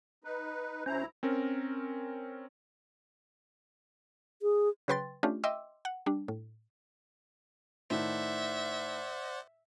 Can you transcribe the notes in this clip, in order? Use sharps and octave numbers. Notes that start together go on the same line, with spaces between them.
D#4 B4
D2 C#4 E4 C5 A#5
C4 C#4 A#4
G#4
C#3 F#3 B4 G5 C6 A6
A3 C#4 D4 F4 G4
D#5 E5 G5 C6 D6 E6
F#5
G3 D4
A2
A2 D#3 C5 D5 E5 F#5